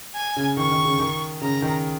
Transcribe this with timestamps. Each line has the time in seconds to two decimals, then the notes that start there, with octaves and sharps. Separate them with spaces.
0.15 G#5
0.36 C#3
0.57 D#3 C#6
0.71 D#3
0.85 C#3
0.99 D#3
1.41 C#3 A#5
1.62 D#3